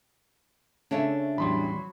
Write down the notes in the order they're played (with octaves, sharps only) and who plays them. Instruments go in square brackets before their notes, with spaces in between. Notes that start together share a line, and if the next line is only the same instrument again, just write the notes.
[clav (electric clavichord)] C#3 A3 [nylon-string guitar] D4 C#5 E5
[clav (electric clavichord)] A1 E2 G3 [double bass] F#3 [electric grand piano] B5 C6